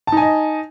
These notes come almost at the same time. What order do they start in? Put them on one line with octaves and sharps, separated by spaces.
A5 D#4 G#5 D#5